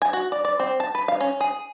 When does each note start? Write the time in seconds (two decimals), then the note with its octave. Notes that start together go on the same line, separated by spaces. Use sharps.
0.02 G#5
0.13 F#4
0.32 D5
0.45 D5
0.60 C4
0.80 A5
0.95 B4
1.08 F5
1.21 C#4
1.41 G#4